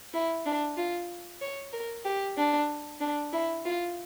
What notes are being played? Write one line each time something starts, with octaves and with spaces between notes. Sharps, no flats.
E4
D4
F4
C#5
A#4
G4
D4
D4
E4
F4